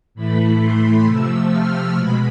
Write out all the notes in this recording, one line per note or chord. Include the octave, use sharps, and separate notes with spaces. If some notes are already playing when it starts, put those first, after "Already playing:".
A2 E3 A3 B5
C6
C3 F3 A3 E6
F6
B2 G#3 B5